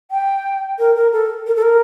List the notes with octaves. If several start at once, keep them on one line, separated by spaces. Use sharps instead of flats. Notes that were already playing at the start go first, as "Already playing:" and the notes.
G5
A#4
A#4
A4
A#4
A4
A#4